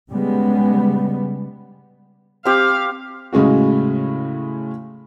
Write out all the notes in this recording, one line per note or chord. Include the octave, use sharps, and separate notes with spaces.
C#3 G3 G#3 B3
C4 G4 F5
A2 C#3 G#3 C#4 F#4